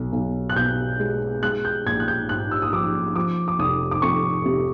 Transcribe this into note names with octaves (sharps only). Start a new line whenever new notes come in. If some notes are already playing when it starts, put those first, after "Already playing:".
Already playing: B1
B1
F#6
B2 G6
G#3
G#3 F#6
G6
A#1 G#6
F#6
G6
G#2 F#6
E6
D#6
F3 D6
F3 D6
D6
F1 D#6
D6
F2 C#6
C3